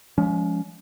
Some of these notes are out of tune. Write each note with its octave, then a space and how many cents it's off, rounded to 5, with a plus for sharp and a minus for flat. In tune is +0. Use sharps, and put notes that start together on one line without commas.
F3 +0 G#3 +0 C#4 +30